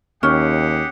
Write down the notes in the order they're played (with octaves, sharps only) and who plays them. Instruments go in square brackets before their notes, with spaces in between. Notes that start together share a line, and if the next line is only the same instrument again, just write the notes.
[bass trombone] D#2 [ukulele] C#4 [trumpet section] G4 G#4 F#5